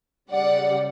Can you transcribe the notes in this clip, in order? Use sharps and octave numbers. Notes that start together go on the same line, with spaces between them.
C#3 G3 D5 F#5